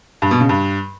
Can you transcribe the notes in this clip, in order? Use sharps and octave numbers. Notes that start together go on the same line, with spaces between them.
G2
B2
C#3
G2